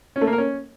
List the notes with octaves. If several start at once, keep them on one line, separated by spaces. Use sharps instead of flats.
C#4
A3
A#3
A#4
C#4